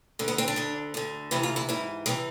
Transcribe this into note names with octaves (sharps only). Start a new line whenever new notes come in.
D2 D3
B3
C4
D4
D2 D3
D2 D3
D2 C3 E3 E4
F4
E4
G#2 E3 E4
C3 E3 G#3